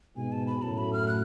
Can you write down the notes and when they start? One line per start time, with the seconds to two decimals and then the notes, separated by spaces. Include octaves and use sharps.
0.16 G#2 B2 G#5
0.32 A5
0.47 B5
0.62 F#2 A2 A5
0.78 B5
0.93 F6
1.08 F#6